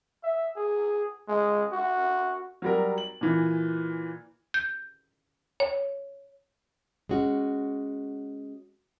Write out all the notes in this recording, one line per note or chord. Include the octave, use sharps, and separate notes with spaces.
E5
G#4
G#3
F#4
F#3 G3 A#4
F#7
A#2 E3
G6
C#5
G#3 C#4 F#4